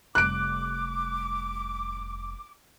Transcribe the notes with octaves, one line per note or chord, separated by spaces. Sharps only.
F1 G3 D6 F#6 D7